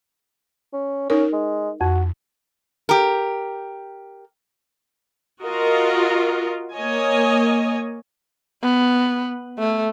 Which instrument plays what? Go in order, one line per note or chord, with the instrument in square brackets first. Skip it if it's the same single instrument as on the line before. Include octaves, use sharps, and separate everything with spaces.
[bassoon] C#4
[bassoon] C#4 [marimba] D#4 A#4
[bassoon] G#3
[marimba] F2 [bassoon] F#4
[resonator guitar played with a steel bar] G4 A#4
[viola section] F4 F#4 A#4 D#5
A#3 C#5 D#5 G#5
[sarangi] B3
A3